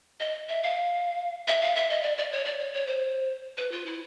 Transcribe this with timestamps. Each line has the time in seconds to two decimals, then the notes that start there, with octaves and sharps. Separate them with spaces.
0.20 D#5
0.49 E5
0.63 F5
1.48 E5
1.61 F5
1.76 E5
1.90 D#5
2.03 D5
2.18 D5
2.32 C#5
2.45 D5
2.59 C#5
2.74 C#5
2.87 C5
3.57 B4
3.72 F4
3.86 E4